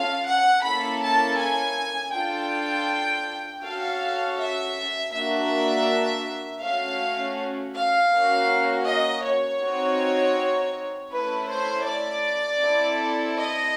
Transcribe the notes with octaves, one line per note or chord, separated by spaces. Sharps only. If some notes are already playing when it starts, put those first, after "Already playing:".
Already playing: C#4 F4 A4 F5
F#5
A#3 C#4 E4 A4 B5
A5
G#5
D4 F4 A4 G5
C#4 F#4 A4 F5
E5
A#3 D4 F#4 E5
A3 C#4 F#4 F5
F5
A#3 C#4 F#4
D#5
C#5
C4 D#4 F#4
A3 C#4 E4 B4
C5
D5
C4 E4 A4
D#5